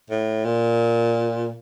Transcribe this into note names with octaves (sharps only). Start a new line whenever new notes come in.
A2
A#2